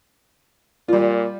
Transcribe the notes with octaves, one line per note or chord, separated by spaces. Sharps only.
A#2 G3 F4